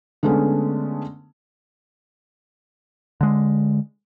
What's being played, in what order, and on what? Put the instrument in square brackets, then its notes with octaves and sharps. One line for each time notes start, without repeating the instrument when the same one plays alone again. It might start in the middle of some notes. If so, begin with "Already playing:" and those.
[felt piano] D3 G#3 A3 B3 C#4
[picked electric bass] D3 G#3